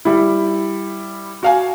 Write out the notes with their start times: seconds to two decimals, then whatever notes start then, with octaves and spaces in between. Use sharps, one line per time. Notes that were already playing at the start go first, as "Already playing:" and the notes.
0.05 G3 E4
1.43 F#4 F5 G#5